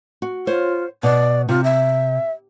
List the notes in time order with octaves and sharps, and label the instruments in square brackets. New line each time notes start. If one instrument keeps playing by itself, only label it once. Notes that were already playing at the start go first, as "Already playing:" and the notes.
[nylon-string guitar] F#4
[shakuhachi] F4 [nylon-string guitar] C5 C#5
[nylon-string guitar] B2 [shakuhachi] D5
[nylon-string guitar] C3 [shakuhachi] F4
[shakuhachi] E5